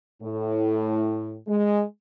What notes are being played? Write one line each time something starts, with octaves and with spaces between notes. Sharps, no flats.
A2
G#3